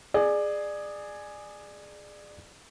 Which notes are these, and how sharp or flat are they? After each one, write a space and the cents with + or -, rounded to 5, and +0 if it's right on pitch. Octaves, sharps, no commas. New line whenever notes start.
G#4 +0 D5 +25